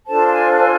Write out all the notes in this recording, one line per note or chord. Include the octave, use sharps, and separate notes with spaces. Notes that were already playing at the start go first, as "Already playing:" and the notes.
D4 F4 A4 C5 A5
G#5
G#5